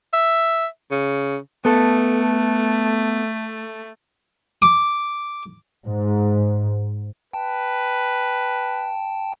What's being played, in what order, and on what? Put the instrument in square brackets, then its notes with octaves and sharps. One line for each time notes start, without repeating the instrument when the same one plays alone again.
[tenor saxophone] E5
C#3
[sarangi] A3 [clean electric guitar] B3 A4
[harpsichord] D6
[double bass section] G#2
[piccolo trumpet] B4 [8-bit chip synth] G5 A5